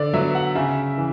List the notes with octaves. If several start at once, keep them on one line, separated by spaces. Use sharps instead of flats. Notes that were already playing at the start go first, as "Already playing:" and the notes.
Already playing: D3 D5
F#3 B3 E5
F#5
C#3 E5
E3